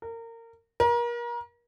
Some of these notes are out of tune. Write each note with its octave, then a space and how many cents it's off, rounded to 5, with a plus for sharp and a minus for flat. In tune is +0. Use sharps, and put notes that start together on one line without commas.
A#4 -25
A#4 +35